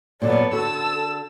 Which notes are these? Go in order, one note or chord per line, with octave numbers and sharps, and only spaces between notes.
A#2 D3 F#3 B3 A4 D5
D3 F#4 A4 A5 E6